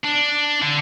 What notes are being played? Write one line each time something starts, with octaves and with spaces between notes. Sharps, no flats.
D4
D3